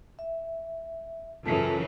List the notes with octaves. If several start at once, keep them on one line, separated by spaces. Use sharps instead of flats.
E5
F#2 C#3 E3 F4 A4 A5